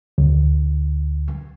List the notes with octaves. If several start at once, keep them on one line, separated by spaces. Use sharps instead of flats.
D2